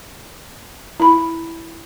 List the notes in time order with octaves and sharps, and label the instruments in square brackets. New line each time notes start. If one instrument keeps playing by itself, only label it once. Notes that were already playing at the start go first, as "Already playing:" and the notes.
[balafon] E4 B5